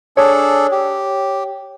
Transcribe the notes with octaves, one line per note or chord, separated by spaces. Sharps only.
D4 G#4 A4 C#5
G4